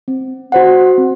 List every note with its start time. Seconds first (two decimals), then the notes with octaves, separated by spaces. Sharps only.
0.08 C4
0.52 F#4 C5 F#5
0.98 C4